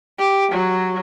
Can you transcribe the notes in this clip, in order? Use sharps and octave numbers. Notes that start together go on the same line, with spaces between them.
G4
F#3